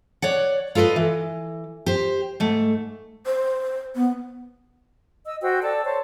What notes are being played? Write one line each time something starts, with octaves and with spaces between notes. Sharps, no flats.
C#5 D5 F#5
F4 A4 B4 D5 D#5
E3
G4 C5
G#2 A3
C5
B3
D#5 E6
F#4 C5 G5 E6
A4 D5 A5 E6
C5 C#5 A5